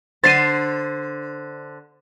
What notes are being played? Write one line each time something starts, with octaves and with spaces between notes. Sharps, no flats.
D3 C5 A6 C7 D#7